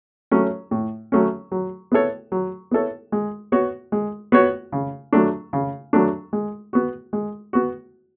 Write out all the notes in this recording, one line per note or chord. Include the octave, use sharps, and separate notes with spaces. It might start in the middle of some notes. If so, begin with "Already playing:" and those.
F#3 A3 C#4
A2
F#3 A3 C#4
F#3
B3 E4 A4 C#5
F#3
B3 E4 A4 C#5
G#3
B3 F#4 C#5
G#3
B3 F#4 C#5
C#3
F#3 A3 D4
C#3
F#3 A3 D4
G#3
B3 F#4
G#3
B3 F#4